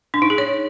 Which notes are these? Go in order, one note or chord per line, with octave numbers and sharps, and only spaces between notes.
D4
D#4
G#4
C#5